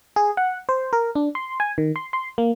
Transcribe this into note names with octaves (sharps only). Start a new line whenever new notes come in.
G#4
F#5
C5
A#4
D4
C6
G#5
D#3
C6
C6
A#3